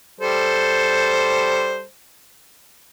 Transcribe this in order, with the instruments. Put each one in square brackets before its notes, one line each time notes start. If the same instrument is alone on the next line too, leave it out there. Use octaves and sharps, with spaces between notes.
[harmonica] G3 A4 C5